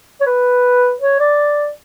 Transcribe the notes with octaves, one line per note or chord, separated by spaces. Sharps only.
C#5
B4
C#5
D5